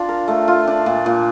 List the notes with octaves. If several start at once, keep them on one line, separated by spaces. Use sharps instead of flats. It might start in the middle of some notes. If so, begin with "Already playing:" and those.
Already playing: D4 F4
A#4
A3
F4
D4
A#2
A#2